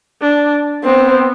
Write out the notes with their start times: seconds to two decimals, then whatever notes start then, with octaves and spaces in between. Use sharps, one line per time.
0.21 D4
0.84 B3 C4